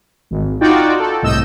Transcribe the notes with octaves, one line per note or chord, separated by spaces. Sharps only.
G#1
D#4 F4 F#4 D5 G5
A4
C2 A2 D#5 E6 G6